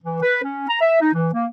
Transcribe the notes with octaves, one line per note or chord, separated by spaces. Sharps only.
E3
B4
C#4
A#5
E5
D#4
E3
A#3